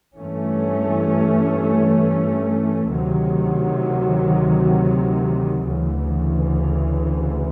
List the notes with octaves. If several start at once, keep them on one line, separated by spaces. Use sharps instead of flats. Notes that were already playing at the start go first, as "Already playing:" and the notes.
G2 E3 A3 C#4
D2 C3 D#3 F#3
D2 C#3 E3